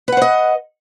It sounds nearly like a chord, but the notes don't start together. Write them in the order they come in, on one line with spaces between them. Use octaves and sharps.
B4 F#5 C5 D#5